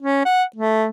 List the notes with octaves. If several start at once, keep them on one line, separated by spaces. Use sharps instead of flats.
C#4
F#5
A3